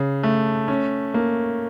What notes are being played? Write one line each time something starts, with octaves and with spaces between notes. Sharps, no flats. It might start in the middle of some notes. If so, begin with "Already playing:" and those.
Already playing: C#3
A3
C#4
A#3